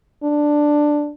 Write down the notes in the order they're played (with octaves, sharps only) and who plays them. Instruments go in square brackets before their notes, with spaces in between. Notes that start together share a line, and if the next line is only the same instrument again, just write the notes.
[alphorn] D4